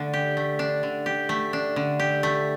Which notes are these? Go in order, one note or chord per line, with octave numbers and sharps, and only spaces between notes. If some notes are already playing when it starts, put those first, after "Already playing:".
Already playing: D3 A3 D4
G4
A3
D4
D3
G4
A3
D4
D3
G4
A3